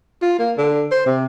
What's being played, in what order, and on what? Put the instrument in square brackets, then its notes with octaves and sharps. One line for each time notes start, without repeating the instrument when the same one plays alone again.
[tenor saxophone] F4
A#3
D3
C5
C3